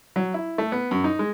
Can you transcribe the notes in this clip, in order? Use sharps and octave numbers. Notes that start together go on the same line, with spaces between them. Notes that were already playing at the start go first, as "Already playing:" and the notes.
F#3
E4
A3
B3
F#2
D#4
G#3